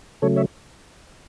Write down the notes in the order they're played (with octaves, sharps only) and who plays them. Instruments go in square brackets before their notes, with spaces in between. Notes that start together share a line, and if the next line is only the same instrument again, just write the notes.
[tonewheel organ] C#3 F#3 A3 A4 C#5
C#5 E5